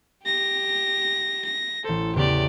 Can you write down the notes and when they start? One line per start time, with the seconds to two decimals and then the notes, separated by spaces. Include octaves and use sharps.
0.24 G4 A#6
1.45 A#6
1.84 A1 A4 C5
2.16 E2 C#3 G4 D5